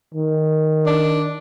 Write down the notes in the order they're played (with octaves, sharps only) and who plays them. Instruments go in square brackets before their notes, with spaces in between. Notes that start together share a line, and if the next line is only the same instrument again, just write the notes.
[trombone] D#3
[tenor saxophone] D4